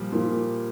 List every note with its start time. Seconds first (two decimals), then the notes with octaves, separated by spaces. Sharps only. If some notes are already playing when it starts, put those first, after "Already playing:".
Already playing: A#2 F3 G3
0.12 A#2 F3